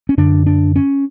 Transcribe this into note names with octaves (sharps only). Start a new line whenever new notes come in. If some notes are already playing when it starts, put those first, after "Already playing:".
C#4
F#2 D3 D4
D4
C#4